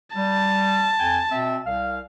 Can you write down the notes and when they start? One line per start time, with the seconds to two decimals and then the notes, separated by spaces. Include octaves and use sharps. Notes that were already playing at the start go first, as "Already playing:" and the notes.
0.16 G3 A5
0.99 F2 G5 G#5
1.32 B2 C4 E5
1.66 C2 F5